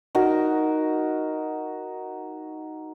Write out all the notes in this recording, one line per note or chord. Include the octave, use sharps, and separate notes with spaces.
D#4 F#4 A#4